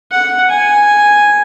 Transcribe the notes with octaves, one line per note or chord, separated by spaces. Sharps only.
F#5
G#5